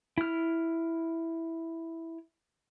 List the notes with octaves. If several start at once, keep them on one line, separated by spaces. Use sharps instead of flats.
E4 F6